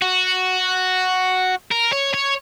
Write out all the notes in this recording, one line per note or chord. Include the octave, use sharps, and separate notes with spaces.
F#4
A#4
C#5
C#5